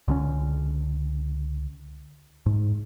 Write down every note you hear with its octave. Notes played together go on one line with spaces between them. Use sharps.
C#2 D3 C4 C#4
G#2